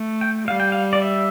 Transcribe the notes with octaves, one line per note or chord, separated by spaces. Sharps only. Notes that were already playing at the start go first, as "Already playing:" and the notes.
Already playing: A3
G5
G3 F5
G5
F5
D5
E5